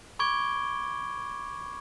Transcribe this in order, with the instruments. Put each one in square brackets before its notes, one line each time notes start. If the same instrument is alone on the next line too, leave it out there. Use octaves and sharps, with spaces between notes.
[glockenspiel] B5 C#6 D6 G#6 D7 G7